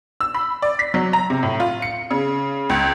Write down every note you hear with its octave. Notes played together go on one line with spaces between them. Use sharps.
E6
B5
D5
B6
F#3
A#5
C3
A2
F4
C#7
C#3
C#2